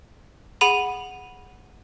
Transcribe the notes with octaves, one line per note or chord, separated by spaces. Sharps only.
G#4 F#5 B5 D#7 F7